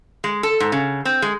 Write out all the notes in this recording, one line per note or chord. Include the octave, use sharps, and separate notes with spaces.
G#3
A4
G#2
C#3
C4
G#3